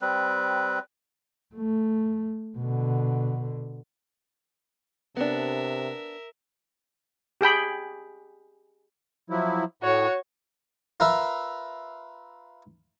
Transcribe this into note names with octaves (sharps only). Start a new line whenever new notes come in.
G3 C4 B4
A3
B2 D3
C3 B3 D4 A#4 E5
G4 G#4 G5 B5
F3 F#3 E4
A2 F#4 C#5
F4 A#4 B4 E5